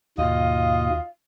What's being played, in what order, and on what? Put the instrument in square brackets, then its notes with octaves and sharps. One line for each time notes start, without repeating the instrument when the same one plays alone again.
[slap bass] D#2 [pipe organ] G#2 B2 A#3 [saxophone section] F4 D#5 [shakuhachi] F5